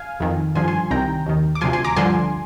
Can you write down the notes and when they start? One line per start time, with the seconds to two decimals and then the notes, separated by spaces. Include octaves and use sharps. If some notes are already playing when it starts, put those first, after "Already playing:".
Already playing: F5 G#5
0.20 F2 D#3
0.55 G2 D3 F3 G#5 C6
0.68 G#5 C6
0.90 C2 C3 D#3 G5 A#5
1.26 D#2 D#3
1.55 D6
1.61 D2 C3 F3 G#5 C6
1.73 G#5 C6
1.85 A#5 D6
1.96 G2 D3 F3 G#5 C6